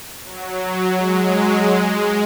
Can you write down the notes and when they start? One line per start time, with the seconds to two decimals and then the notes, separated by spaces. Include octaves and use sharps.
0.24 F#3
0.96 G#3
1.69 G#3